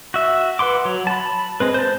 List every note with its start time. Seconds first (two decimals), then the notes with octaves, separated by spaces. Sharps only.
0.14 F#4 E5
0.59 B4 F#5 C6 D6
0.85 F#3
1.07 A5 B5
1.60 G#3 C4 B4
1.74 C5 A5